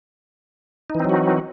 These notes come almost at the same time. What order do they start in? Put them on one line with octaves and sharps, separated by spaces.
D#4 E3 C4 F#3 F#4